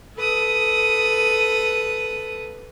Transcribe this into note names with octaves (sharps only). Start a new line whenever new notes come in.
A4 B4 D#6